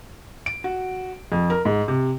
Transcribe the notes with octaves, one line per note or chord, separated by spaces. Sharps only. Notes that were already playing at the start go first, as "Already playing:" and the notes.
D7
F#4
F2
A#4
G#2
C3